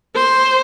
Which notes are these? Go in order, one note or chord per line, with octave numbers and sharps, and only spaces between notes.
C5